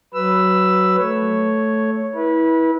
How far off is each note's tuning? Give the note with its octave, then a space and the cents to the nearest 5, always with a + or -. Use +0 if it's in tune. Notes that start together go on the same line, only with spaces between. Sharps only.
F#3 +15 B4 +0 E6 +5
A3 +0 C#5 +0
E4 -20 B4 -30